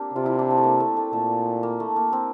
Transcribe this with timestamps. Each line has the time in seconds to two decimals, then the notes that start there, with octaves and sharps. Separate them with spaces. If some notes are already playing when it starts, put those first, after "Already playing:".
Already playing: A#3 C4 D4 G4
0.14 C3 F4
0.26 E4
0.39 D4
0.50 C4
0.58 A3
0.64 A#3
0.80 A3
0.97 A3
1.13 A#2 A3
1.63 A#3
1.80 A3
1.96 A#3
2.13 C4